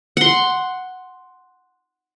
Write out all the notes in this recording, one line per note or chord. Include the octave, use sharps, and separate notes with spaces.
F#5 C6